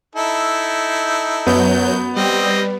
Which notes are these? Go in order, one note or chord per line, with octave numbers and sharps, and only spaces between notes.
D#4 E4 A4
F#2 F#3 B3 G6
G3 C4 D#5